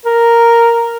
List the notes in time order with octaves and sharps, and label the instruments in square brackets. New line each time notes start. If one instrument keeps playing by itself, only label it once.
[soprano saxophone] A#4